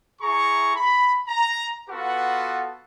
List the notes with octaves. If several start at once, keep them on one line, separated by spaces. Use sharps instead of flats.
E4 G#4 A#5 C#6
B5
A#5
B3 F4 F#4 A4 B4 F#5